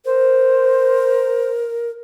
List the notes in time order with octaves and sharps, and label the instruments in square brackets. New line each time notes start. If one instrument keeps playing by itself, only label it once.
[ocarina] A#4 [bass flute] C5